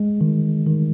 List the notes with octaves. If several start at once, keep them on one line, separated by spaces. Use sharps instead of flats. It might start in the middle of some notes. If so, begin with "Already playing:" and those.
Already playing: G#3
D#3
D#3